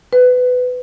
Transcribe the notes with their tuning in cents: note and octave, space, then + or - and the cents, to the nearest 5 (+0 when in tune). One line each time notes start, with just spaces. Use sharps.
B4 +20